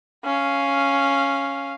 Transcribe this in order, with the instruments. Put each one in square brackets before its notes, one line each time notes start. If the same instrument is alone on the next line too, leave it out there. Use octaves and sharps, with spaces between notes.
[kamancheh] C#4 F5